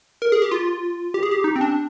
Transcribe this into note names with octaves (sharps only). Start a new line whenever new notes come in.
A#4
G#4
G4
F4
G4
G#4
G4
D#4
C4
D4